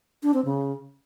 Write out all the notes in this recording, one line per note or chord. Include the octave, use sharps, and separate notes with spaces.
D4
C4
C#3